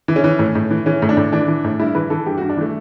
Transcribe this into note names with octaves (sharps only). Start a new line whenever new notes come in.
E3
C#4
E3
A2
A2
E3
E3 C#4
A2
D4
A2
E3 D4
E3
A2
G2 E4
E3 B4
E3 A4
G2 G4
G2 F#4
D4
E3 A3